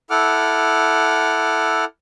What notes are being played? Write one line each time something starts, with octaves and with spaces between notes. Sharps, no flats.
E4 A4 F#5 D6 F6